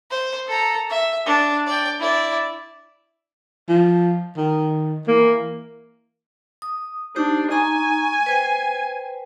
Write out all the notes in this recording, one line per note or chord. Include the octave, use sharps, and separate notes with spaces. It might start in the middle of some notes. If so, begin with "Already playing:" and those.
C5
A4 A#5
E5
D4
D5 G5
E4 D5
F3
D#3
E3 A#3
D#6
D4 D#4 G4 C5
D#4 G#5 A#5 C#6
B4 C5 G5